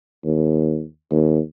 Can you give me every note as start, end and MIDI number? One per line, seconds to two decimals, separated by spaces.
0.24 0.83 39
1.10 1.39 39